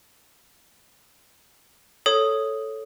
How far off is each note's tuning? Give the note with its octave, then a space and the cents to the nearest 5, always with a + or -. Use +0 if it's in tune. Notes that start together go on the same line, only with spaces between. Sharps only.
A4 +0 C#5 +0 D#6 +0